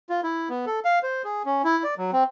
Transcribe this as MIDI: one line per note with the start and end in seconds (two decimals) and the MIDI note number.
0.09 0.21 65
0.23 0.49 64
0.49 0.65 59
0.66 0.80 69
0.85 0.99 77
1.03 1.22 72
1.24 1.43 68
1.45 1.62 61
1.64 1.83 64
1.84 1.94 74
1.98 2.11 54
2.13 2.24 60